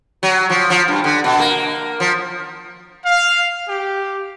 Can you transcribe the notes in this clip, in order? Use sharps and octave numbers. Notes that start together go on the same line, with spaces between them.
F#3
F3
F3
G2
D3
B2
A#3
F3
F5
G4